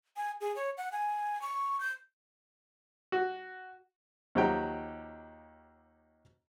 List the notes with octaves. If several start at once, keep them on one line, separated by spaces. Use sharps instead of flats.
G#5
G#4
C#5
F#5
G#5
C#6
G6
F#4
D#2 F3 F#3 G4 G5